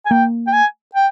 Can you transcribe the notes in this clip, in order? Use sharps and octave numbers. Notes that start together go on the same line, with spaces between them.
G#5
A#3 G5
G5
G#5
G5